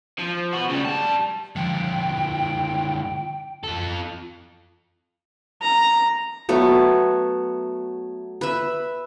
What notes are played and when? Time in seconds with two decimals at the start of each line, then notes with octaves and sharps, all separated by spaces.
0.19 F3
0.53 B3 F#4
0.70 C#3 G3
0.85 G3 A5
1.56 D3 F3 G5
3.64 F4 A4
5.62 A#5
6.49 F#3 A3 B3
8.41 B4 E5